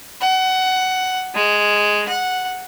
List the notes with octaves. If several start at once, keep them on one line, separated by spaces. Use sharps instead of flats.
F#5
G#3
F#5